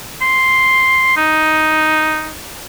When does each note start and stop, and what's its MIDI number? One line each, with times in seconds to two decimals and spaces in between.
0.22 1.12 84
1.17 2.33 63